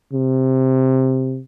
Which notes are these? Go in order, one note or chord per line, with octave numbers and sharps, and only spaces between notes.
C3